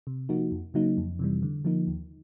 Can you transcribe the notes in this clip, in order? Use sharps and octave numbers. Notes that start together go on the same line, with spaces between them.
C3
F3 A#3 D#4 F#4
F2
C#3 F#3 A#3 D#4
F2
C3 E3 G3
D3
F3 A#3 D#4
D#2